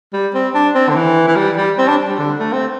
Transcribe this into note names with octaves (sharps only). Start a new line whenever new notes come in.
G3
C4
D4
C4
D3
E3
E3
G3
G3
C4
D4
G3
D3
A3
C4